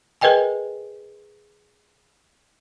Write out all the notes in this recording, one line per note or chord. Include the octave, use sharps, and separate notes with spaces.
G#4 A#4 B4 D#5 G5 G#5